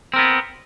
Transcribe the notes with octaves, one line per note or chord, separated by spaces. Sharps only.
B3 C4 A#4